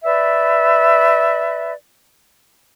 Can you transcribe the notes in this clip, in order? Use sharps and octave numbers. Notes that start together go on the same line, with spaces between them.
B4 D5 E5